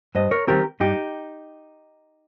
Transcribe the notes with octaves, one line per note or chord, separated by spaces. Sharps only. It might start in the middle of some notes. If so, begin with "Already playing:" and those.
G2 C5 D#5
A#4 C#5
D#3 G3 C4 G4 A#4
G2 D#4 G4